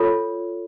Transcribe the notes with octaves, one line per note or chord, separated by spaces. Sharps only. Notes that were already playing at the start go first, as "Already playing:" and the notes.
Already playing: F4 A4 C#5